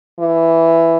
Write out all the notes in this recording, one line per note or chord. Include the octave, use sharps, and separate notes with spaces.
E3